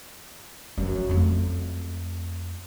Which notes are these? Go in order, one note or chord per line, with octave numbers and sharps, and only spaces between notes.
F#2 F3
F2 A3